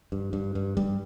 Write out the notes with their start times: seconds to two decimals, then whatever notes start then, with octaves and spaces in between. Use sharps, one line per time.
0.12 G2
0.33 G2
0.55 G2
0.77 G2 G3